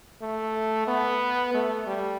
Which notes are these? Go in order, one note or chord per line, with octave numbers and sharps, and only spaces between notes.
A3
B3
A3
G3